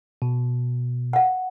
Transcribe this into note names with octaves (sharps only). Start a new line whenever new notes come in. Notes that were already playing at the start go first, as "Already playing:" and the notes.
B2
F5 F#5